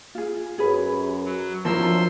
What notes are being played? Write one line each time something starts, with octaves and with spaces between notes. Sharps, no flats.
F4 G#4
F#2 G#4 B4
F#3
F3 F#3 C4 D4 E4 A#4 C6 E6